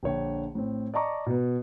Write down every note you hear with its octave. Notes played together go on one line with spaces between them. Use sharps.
A#1 D3 C#5 G5
A2 C4
D5 D#5 A5 A#5 C#6 D6
B2 B3